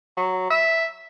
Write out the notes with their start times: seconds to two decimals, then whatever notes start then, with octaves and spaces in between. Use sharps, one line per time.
0.17 F#3
0.50 E5